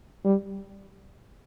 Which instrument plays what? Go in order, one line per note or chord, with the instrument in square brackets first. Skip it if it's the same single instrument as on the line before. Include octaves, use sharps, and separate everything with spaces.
[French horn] G3